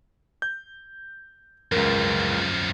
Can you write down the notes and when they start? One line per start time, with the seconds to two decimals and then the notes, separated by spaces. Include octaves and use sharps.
0.42 G6
1.72 C#2 F#2 F3 A#4